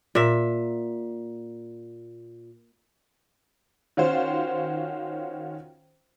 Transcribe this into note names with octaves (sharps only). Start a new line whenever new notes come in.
A#2 E5
D#3 C#4 F4 F#4 C5